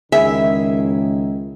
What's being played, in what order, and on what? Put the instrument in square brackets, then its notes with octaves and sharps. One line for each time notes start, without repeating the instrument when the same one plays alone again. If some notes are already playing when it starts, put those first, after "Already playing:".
[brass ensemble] C#2 D#3 [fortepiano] E4 G#4 [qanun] E5